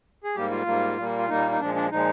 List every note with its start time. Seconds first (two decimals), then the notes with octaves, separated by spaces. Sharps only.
0.24 G#4
0.35 G#2 G3 A#3 G4
0.51 F4
0.66 G#2 G3 A#3
0.97 A#2 G3 A#3
1.18 F4
1.29 A#2 G3 A#3 D#4
1.51 D#4
1.60 A#2 F3 G#3 D4
1.75 D4
1.92 A#2 F3 G#3 D#4